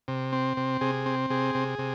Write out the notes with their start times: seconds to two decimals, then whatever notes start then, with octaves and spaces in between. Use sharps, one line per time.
0.08 C3
0.32 C4
0.57 C3
0.81 C3 G#4
1.06 C4
1.30 C3 G#4
1.55 C3
1.79 C3